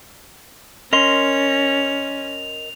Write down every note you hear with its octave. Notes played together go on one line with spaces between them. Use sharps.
C#4 A#4 D#5 C6 F7